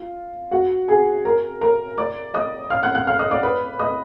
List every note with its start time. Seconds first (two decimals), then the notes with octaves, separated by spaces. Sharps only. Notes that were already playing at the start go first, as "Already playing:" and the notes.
Already playing: F4 F5
0.51 F#4 F#5
0.88 G#4 G#5
1.25 A#4 A#5
1.61 A#4 A#5
1.98 D5 D6
2.34 D#5 D#6
2.70 F5 F6
2.83 F#5 F#6
2.95 F#5 F#6
3.07 F5 F6
3.19 D#5 D#6
3.31 D5 D6
3.43 B4 B5
3.79 D#5 D#6